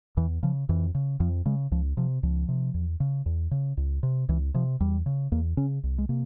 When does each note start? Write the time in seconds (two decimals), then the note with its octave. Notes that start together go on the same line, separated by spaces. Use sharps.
0.17 E2 E3
0.43 C#3 F3
0.69 F2 E3
0.95 C#3
1.20 F2 F3
1.45 C#3 G#3
1.71 C#2 F3
1.97 C3 F3
2.23 C#2 F3
2.48 C3
2.74 E2
3.00 C#3
3.26 E2
3.51 C#3
3.77 C#2
4.03 C3
4.29 C#2 E3
4.54 C3 F3
4.80 E2 G3
5.06 C#3
5.32 E2 A#3
5.57 C#3 C#4
5.83 C2
5.98 G#3
6.09 C3 A#3